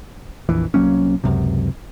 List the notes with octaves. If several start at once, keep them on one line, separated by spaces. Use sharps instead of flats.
A#1 F2 E3
C2 F#3 A#3 C#4
C#2 F#2 C3